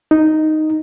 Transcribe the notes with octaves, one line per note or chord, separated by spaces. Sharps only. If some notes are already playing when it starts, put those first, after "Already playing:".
D#4